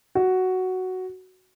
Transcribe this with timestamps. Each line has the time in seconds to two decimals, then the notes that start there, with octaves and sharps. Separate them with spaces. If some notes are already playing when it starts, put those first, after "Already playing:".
0.15 F#4